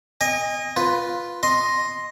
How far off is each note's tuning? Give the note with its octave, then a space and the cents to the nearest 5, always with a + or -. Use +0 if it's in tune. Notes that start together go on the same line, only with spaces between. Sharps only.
D#5 +5 G#5 -35
F4 +0 B4 +0
D#5 +0 C6 +0